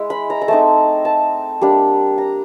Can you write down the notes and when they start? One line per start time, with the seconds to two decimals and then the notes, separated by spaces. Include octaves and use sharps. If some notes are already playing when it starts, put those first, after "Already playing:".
Already playing: G#3 E4
0.10 B5
0.30 A#5
0.42 A#5
0.48 A3 C4 D#4 A5
1.05 A5
1.61 G3 A#3 D4
2.18 A#5